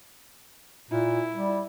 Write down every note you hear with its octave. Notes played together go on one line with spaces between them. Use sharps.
A#2 E4
G3